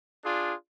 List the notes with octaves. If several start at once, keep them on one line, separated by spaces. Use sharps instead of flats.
D4 F4 G#4